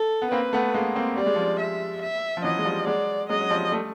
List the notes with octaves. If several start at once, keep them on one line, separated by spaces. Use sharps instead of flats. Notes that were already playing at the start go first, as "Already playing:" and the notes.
Already playing: A4
B3
A#3 C4 B4
A3 B3
G#3 A#3
A#3 C4
G3 D5
G#3
F3 G3
E5
E5
F3
E3 F#3 D#5
G#3
F3 G3
F#3 G#3 D5
F#3 G#3 D#5
F#3
F3 G3
G3 A3